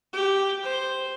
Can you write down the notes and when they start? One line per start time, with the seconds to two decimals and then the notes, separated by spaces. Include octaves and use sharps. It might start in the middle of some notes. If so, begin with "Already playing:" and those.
0.13 G4
0.62 C5